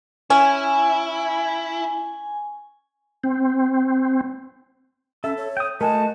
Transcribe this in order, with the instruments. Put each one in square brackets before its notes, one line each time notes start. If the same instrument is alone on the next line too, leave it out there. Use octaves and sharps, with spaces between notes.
[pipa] C#4 [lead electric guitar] E4 [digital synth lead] G#5
[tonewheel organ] C4
[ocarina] C#4 [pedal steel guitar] A4 [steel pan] E5
[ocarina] C#5
[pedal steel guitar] G5 D#6
[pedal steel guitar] A3 F#4 [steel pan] A#4 G#5 [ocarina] D#5 [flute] A5